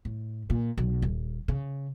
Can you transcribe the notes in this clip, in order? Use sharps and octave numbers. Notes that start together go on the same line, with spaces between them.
A2
A#2
B1
D#1
C#3